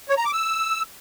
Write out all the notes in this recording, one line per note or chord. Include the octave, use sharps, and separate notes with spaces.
C#5
A#5
D6
E6